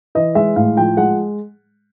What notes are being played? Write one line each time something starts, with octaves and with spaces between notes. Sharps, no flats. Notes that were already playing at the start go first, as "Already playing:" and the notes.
E3 D#5
G#3 E5
A2 F5
F3 G5
G#3 F#5